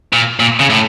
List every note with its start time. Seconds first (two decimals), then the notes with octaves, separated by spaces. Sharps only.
0.13 A#2
0.40 A#2
0.60 C#3
0.70 A2